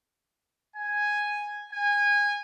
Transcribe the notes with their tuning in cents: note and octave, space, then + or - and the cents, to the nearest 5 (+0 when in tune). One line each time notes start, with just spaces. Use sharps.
G#5 +0
G#5 -20